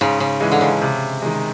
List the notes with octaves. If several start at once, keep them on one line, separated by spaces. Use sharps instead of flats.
G#2 C#3
C#3
E3 G#3
D3
C#3
C3
D#3 G#3